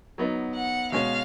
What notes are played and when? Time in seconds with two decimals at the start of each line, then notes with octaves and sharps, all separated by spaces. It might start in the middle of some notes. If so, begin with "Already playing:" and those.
0.18 F#3 B3 D#4
0.55 F#5
0.92 B2 G#3 C#4 F5